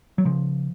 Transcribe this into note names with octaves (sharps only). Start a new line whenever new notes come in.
F#3
C#3 F3